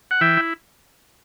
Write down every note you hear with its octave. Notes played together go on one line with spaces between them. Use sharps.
F#5
E3 E5 G5
E4